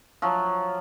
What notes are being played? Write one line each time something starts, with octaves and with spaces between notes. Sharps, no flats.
F3 F#3